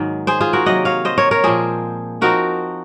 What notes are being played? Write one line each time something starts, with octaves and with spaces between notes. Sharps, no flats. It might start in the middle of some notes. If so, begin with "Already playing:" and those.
Already playing: G#2 D#3 F#3 A#3
G#4 C5
F4 G#4
F#4 A#4
C3 F#3 A#3 D#5 F#5
C#5 F5
C5 D#5
A#4 C#5
A#4 C#5
A#2 F3 G#3 C4 G#4 C5
F3 C4 D#4 F#4 A#4